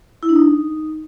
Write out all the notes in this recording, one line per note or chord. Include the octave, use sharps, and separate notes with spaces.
E4
D4
D#4